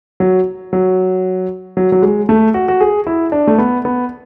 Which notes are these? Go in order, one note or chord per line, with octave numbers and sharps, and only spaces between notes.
F#3
F#3
F#3
F#3
G#3
A3
F#4
F#4
G#4
E4
D4
A3
B3
B3